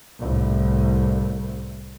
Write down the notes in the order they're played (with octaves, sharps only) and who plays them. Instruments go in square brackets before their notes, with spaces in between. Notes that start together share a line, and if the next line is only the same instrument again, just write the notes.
[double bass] C2 A2